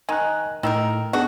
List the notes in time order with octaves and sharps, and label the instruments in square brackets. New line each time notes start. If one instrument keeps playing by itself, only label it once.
[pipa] D#3 [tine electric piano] G#5 A#5 F#6
[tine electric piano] A2 E6 [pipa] D#3 D#4 A#4
[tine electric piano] B3 D4 G#4 [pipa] F#4